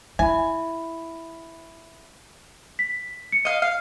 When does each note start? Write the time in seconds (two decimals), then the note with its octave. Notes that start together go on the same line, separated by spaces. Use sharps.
0.19 E4 E5 G#5 B5
2.79 B6
3.32 C#7
3.45 D#5 F5
3.62 F5